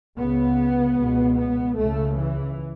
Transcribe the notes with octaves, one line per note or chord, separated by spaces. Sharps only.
C#2 C#3 B3
C#2 B2
B3
C#2 C#3 A3
E3